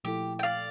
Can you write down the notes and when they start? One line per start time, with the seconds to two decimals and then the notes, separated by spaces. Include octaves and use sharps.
0.04 A#2 F3 A3 E4 G4 A4
0.39 G5
0.43 D5 F5